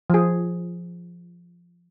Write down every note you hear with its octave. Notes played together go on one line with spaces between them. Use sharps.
F3 G#4